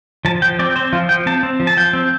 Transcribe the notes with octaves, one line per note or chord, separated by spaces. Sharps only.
F3 A5
F3 G5
C4 D5
C4 C5
F3 F4
F3 G5
C4 A5
C4
F3
A5
F3 G5
C4